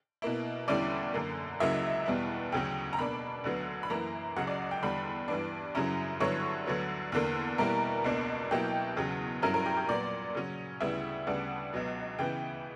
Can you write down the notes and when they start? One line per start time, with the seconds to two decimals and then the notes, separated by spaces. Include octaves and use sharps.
0.22 B2 A#3 E4
0.68 E2 D3 G3 C#4 E4 D5
1.14 F#2 D3 A#3
1.60 C#2 C#3 F#3 A#3 E4 E5
2.06 E2 B2 G3 B3 E4
2.52 D2 C#3 F#3 C#4 G5
2.93 A#5
2.99 B2 A#3 D4 B5
3.44 D2 D3 F#3 B3
3.83 B5
3.90 F#2 E3 A#3 E4 A#5
4.36 C#2 C#3 F#3 F#5
4.47 D5
4.71 G5
4.82 E2 D3 G3 B5
5.28 G2 E3 B3 D4
5.75 F#2 C#3 F#3 C#4 E4 A#5
6.20 G2 D3 F#3 B3 E4 C#5
6.66 D2 D3 F#3 B3
7.12 E2 D3 A#3
7.58 B2 G3 A#3 E4 A#4
8.04 C#2 B2 A#3 D4
8.51 B2 F#3 A#3 E4 G4
8.97 E2 C#3 F#3
9.42 G2 F#3 C#4 E4 A#4
9.54 A#4
9.66 G4
9.77 G4
9.89 A#2 F#3 B3 D5
10.35 C#3 F#3 C#4
10.80 D2 C#3 G3 B3 E4 E5
11.27 D2 C#3 G3 B3 D4 F#5
11.73 C#2 B2 F#3 B3
12.18 C#3 E3 B3 E4 G5